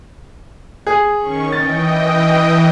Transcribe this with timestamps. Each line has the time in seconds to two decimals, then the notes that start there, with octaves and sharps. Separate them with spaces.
0.87 G#4
1.19 D#3 C#4 C#6
1.52 E3 D#5 G5 A6